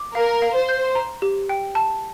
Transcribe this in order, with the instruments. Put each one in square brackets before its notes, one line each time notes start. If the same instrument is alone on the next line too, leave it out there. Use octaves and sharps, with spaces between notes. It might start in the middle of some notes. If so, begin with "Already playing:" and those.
Already playing: [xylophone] D6
[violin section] A#4 [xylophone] F5
[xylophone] F5
[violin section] C5
[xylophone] G6
A#5
G4
G5
A5